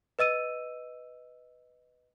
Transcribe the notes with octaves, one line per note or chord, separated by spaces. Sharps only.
B4 D#5 E6 D#7